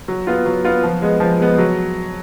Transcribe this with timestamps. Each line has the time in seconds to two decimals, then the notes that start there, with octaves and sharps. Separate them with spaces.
0.08 F#3
0.27 B3 F4
0.46 F#3
0.65 B3 F4
0.83 F3
1.02 G#3 B3
1.20 F3
1.40 G#3 B3
1.58 F#3